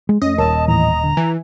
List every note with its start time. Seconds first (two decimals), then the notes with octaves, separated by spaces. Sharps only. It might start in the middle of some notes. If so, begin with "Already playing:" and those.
0.09 G#3
0.22 F2 A3 C#4 D#5
0.38 D#1 A#4 C#5 A5 E6
0.68 A2 D#3 E3 A#5
1.03 D3
1.17 E3 G#5